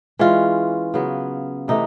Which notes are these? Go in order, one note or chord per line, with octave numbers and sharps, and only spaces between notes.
E3 G#3 C#4 F4
C#3 F#3 B3
C3 E3 A3 D#4